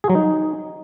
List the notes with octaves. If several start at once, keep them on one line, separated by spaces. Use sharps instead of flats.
G#4
F#3
D#4